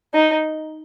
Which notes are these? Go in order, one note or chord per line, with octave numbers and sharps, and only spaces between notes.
D#4